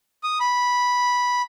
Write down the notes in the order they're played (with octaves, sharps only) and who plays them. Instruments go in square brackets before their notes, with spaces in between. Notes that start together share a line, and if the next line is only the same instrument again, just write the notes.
[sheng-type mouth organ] D#6
B5